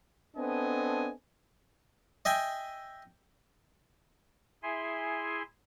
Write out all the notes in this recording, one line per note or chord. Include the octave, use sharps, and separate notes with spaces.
B3 C4 D4 A4 D#5 G#5
D#5 E5 G5 G#5
E4 G#4 E5 G#5 C6